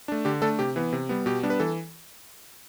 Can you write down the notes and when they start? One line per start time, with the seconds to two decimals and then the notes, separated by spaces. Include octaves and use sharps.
0.08 A3 D4
0.25 D3 G4
0.42 A3 D4 A4
0.59 C3 G4
0.76 E3 B3
0.93 C3
1.09 G3 B3
1.26 B2 G4
1.43 G3 B3 D4
1.50 B4
1.60 E3 A4